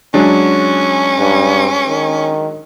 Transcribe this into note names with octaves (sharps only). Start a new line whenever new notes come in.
F#3 G#3 C#4 D4
G2
D#3